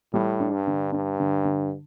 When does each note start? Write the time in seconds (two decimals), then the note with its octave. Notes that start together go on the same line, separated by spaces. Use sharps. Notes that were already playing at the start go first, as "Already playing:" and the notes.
0.14 A2 G3
0.40 D4
0.53 G2
0.67 D3
0.92 G2 D4
1.20 D3
1.45 D3